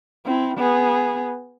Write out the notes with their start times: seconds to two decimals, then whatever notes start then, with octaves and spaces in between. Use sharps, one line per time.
0.25 C4 E4
0.58 B3 G#4